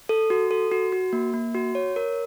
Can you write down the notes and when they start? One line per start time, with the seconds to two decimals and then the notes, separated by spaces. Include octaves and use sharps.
0.09 A4
0.30 F#4
0.51 A4
0.72 F#4
0.92 F#4
1.13 A#3
1.34 A#3
1.54 F#4
1.75 C#5
1.96 A#4